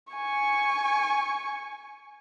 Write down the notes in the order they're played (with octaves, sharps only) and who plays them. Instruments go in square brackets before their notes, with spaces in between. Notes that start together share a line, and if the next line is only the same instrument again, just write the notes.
[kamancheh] G#5 C#6